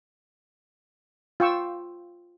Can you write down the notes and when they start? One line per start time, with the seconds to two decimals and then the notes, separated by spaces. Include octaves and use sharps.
1.40 F4 G5 C#6 E6